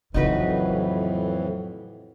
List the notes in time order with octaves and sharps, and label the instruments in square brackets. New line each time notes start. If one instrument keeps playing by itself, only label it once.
[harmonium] F2 A2 E3 [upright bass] C#3 F#3 [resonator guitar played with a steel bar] D#4 F#4 B4